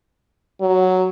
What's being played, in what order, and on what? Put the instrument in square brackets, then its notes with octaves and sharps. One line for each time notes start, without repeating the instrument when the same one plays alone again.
[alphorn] F#3